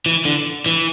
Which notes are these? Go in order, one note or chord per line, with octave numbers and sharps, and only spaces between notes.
E3
D3
E3